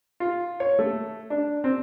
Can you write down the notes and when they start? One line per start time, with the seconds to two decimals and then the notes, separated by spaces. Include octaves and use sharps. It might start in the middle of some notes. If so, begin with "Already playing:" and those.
0.20 F4
0.60 C#5
0.79 A3
1.30 D4
1.64 C4